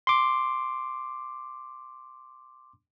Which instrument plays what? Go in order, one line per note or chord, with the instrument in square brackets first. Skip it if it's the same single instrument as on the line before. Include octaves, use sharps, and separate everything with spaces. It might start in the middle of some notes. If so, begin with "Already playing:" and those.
[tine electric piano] C6 D6